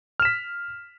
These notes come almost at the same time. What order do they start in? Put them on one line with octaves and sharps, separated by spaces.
F6 E7 B6